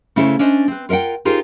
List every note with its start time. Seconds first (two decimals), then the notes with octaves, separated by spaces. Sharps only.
0.16 C#3 A3 C#4 E4 A4 C5
0.39 C#4 D4 C5 D#5
0.68 C4 B4
0.89 F4 A#4 D#5 F#5 G5
1.25 D#4 F4 G4 G#4 A#4 C5